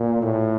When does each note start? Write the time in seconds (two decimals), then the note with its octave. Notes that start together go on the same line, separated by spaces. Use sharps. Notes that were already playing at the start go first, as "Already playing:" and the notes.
Already playing: A#2
0.22 A2